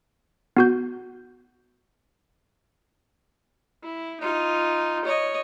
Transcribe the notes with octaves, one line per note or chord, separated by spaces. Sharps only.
B3 F#4 G6
E4
D#4 F4
C#5 D#5